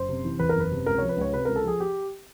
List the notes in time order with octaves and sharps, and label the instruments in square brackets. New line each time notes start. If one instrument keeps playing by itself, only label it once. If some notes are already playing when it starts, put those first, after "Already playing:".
Already playing: [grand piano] F#1 C5
C3
E3
E2 B4
A#4
F#1 B4
C3
C#2 A#4
F3 C#5
B4
C#2 C#5
C3 B4
C#2 A#4
A4
F3 G#4
G4